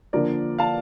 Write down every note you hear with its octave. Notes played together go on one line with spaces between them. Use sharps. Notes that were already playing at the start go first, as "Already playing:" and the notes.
D3 F3 A#3 D4 A#4 D5
F5 A5